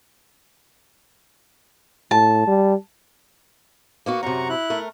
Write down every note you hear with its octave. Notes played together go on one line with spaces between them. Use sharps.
A2 A5
G3
A#3 B3 F#4
F#2 C3 F#5 A#5 C#6
E4 F#6
A3 A#4